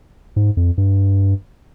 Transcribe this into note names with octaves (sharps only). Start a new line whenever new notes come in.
G#2
F2
G2